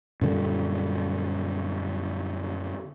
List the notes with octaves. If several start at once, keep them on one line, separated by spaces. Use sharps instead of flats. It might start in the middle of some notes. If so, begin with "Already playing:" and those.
F#2 A#2 D3 G3